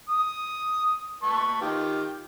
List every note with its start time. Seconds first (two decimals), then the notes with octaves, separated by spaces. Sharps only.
0.09 D#6
1.23 B4 A5 C#6
1.61 D#3 F4 G4